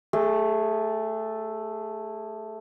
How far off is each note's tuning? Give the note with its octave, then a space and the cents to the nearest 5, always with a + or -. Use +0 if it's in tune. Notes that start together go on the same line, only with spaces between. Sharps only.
A3 +0 G#4 -25